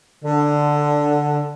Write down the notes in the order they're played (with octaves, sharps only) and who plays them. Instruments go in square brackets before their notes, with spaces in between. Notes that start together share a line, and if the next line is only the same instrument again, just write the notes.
[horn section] D3